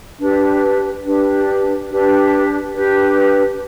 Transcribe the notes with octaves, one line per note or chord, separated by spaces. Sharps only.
D4 G4 B4
D4 G4 B4
D4 G4 B4
D4 G4 B4